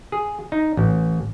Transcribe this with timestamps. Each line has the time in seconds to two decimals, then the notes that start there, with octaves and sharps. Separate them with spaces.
0.12 G#4
0.52 D#4
0.77 A1